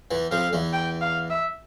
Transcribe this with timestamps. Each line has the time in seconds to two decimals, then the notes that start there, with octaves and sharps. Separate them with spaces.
0.11 E2 E3
0.31 F2 F3 F5
0.53 E2 E3
0.73 G5
1.02 F5
1.30 E5